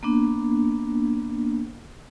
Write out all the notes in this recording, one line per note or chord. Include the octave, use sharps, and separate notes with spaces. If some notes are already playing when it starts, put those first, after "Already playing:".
A#3 B3 D4